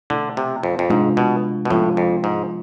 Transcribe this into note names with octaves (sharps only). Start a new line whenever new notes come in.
B2 D3 A3 E4
C3
F2
F2
G#2 C3 G#3 D4 F4
B2
B2
A2 F3 G#3 B3 F4
F2
G#2